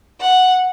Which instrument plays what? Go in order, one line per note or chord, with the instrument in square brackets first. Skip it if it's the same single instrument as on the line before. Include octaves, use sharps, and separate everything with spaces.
[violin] F#5